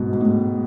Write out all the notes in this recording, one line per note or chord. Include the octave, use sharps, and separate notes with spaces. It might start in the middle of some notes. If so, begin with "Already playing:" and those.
Already playing: G#2 B2
G#2
A2